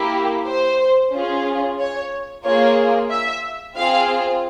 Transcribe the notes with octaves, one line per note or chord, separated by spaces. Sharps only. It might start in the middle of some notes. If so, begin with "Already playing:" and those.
Already playing: A#3 E4 G4
C5
C#4 F4 G#4
C#5
A#3 F4 G#4 C#5
E5
C4 F4 G#4 F5